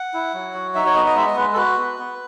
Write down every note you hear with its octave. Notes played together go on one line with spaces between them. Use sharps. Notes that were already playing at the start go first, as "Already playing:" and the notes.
Already playing: F#5
E4
F#3
F#4
D#4 E5
C#5
B3 D#5
D#5
G#3 E5
D#5
G#3 B4
A4
F#4 B4
B3
B3